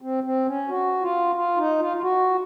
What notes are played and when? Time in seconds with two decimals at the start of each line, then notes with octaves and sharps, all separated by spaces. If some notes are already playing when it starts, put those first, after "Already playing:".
0.01 C4
0.24 C4
0.47 C#4
0.68 F#4
1.02 F4
1.35 F4
1.57 D#4
1.79 F4
1.97 F4
2.02 F#4